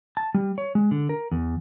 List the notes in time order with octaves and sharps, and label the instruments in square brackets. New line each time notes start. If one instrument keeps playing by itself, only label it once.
[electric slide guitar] A5
G3
C#5
G#3
D3
A#4
E2